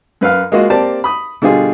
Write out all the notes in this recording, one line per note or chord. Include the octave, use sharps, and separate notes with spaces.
F#2 B4 F5 F6
G#3 A#3 F4 F#4 D#5
A#3 C4 G4 D5 A5
B5 D#6
B2 D3 G3 F4 G#4